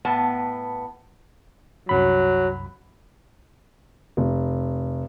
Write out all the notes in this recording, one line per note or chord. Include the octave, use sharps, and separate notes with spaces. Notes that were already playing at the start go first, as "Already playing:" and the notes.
A2 B3 A5
C2 F#2 F#3 B5
F1